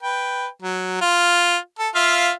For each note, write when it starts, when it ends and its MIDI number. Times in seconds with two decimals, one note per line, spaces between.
0.03 0.47 71
0.03 0.47 79
0.62 0.99 54
1.01 1.57 65
1.79 1.89 69
1.95 2.31 65
1.95 2.31 76
1.95 2.31 77